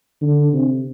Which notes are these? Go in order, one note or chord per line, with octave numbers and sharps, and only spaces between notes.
D3
C3